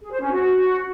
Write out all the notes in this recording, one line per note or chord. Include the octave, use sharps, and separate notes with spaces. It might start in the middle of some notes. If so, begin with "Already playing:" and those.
G#4
C5
C#4
F#4